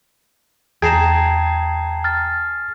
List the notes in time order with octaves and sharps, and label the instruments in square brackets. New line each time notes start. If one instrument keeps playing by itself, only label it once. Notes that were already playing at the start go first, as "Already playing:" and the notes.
[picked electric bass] E2 [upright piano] G#4 [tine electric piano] G5 A5 A#5 [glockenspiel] G#6 C7 E7
[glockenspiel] F6 A6